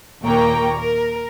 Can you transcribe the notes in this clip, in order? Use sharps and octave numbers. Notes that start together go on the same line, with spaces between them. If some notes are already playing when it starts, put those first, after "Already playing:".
D#2 A#2 A#3 G5 A#5 C#6
A#4